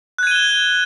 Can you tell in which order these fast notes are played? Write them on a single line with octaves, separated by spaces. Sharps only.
F#6 G#6 D#7 G7 E7